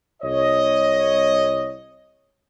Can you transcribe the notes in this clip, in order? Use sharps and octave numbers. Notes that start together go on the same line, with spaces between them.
C2 C#5 D#5